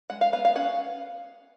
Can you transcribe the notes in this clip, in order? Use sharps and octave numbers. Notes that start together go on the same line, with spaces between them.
G#3 F#5
F5
B3 F5
F5
C#4 F#5